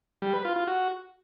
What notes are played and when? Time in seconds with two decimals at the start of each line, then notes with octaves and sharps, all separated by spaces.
0.22 G3
0.33 B4
0.45 F4
0.56 F4
0.67 F#4